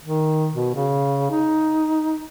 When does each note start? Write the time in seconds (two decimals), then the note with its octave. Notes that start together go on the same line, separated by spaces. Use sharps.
0.04 D#3
0.54 B2
0.75 C#3
1.31 D#4